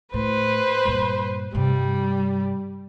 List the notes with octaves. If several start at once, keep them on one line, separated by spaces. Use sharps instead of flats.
A2 B4 C5
G2 A#2
G2 C3 G3